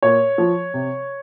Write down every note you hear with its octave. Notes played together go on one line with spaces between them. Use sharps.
A#2 C#5
F3
C3